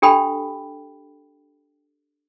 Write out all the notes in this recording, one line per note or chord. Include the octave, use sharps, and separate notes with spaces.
D4 G4 A4 G5 B5